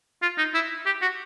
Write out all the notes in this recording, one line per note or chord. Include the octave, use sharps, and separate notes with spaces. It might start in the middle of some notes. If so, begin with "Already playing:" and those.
F4
D#4
E4
G4
F#4